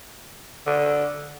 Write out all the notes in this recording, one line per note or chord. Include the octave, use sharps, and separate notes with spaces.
D3